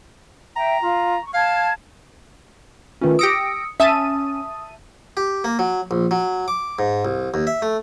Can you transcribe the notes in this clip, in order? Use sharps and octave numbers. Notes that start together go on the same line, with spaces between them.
E5 G5 A#5
F4
C#6
F5 A5 G#6
D#3 A3 C#4 F4 B4
G4 D#6 E6 A#6 C#7 D7
C#4 E5 A5 D#6 D#7
G4
A#3
F#3
A#1
F#3
D6
G#2
C2
D#2
E5
A3